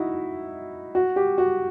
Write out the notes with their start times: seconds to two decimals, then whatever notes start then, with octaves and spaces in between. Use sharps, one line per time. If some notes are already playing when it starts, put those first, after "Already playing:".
Already playing: D#4 E4 F#4
0.95 F#4
1.16 G4
1.38 F#4